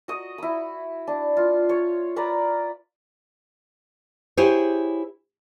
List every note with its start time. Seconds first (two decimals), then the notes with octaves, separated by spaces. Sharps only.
0.08 F#4 D#5
0.38 E4 B5
1.07 D4
1.37 F4
1.69 C#5
2.16 B4 D5 A#5
4.37 E4 G4 G#4 C5 C#5